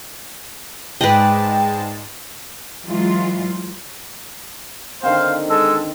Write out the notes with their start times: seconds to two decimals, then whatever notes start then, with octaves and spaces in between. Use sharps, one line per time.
1.01 G#2 G#3 B4 D5 D#5 G5 A5
2.85 E3 F#3 G#3 F4
5.03 D3 D#3 C4 C5 F5
5.50 G#3 A4 E6